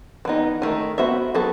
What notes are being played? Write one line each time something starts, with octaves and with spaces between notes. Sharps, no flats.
E3 B3 D#4
D#3 A3 D#4
B3 F#4 C5 E5
F#3 B3 F#4 A4